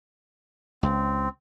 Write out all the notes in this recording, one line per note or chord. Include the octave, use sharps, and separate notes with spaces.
C#2 C4